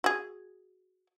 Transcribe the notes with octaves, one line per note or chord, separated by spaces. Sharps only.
F#4 G#4